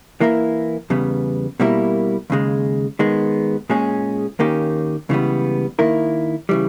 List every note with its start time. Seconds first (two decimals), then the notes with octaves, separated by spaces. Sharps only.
0.20 E3 A#3 E4 A#4
0.90 E2 C#3 G3 B3
1.60 B2 G3 A#3 E4 A#4
2.30 D#2 C#3 G#3
2.99 D#3 G#3 B3
3.70 A#2 G#3 C#4 G#4
4.39 D#2 D#3 A#3 C#4 G4
5.09 C#2 C#3 E3 G3 B3
5.79 D#3 A#3 E4 A#4
6.49 C#3 E3 G3